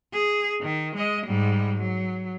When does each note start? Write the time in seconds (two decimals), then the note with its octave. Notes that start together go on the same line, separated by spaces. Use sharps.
0.13 G#4
0.62 D#3
0.95 G#3 D#5
1.26 G#2 G3
1.78 F#3